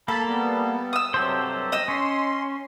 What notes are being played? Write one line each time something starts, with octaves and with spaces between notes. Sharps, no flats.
A#3 A4 A5 B5
G3 B3
D#6 E6
G2 C3 F#3 G4 A4 C5
D#5 E6
C#4 C6